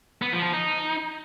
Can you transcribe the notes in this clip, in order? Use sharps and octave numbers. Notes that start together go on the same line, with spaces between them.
B3
F3
F3
D#4